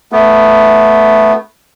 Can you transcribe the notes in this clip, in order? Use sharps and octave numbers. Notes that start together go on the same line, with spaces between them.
A3 B3